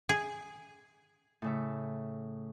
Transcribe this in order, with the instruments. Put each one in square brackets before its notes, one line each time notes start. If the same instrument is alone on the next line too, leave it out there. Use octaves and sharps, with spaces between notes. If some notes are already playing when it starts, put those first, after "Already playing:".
[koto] G#4
[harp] A2 C#3 E5